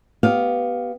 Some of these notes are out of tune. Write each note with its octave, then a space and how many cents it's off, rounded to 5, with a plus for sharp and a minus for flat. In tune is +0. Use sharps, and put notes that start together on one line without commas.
B3 +0 G4 -15 F5 +5